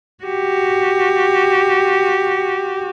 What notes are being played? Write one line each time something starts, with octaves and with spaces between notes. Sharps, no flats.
F#4 G4